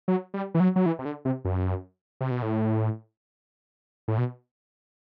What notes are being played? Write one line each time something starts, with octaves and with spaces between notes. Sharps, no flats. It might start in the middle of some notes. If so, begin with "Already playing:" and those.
F#3
G3
E3
F#3
F#3
E3
C3
D3
C3
F#2
C3
B2
A2
A2
B2